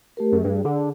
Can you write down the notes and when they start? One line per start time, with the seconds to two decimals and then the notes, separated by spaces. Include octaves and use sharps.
0.17 A3 G4 A#4
0.32 F#2 G#4
0.44 G2
0.65 D3